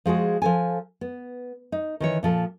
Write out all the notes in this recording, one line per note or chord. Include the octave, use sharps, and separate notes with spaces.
F3 G#3 F#4 G#4
F3 A4 G#5
B3
D#4
D#3 E3 C#5
A#2 F3 A4